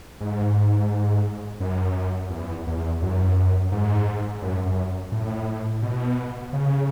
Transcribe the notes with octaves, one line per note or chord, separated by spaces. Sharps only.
G#2
F#2
E2
E2
F#2
G#2
F#2
F#2
A2
B2
C#3